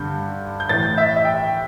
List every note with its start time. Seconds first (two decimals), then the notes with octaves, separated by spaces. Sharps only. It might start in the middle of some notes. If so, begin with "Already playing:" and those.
Already playing: G2 D3 G6
0.60 G6
0.69 A2 E3 A6
0.83 G6
0.98 E5
1.16 E5
1.25 G5